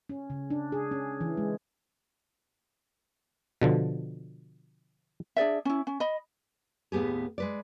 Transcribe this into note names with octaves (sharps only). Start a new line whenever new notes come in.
C#4
C#3
D4
G#4
C#4
E3
G#3
B2 D3 F3
D4 G#4 D5 E5
C#4 E4
C#4
D#5 B5
D#2 A2 B3 G4 G#4
G#3 B4 D5